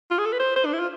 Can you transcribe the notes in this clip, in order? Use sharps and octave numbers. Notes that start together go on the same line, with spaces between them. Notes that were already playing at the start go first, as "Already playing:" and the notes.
F4
G#4
A4
B4
C5
C5
D4
E4
F4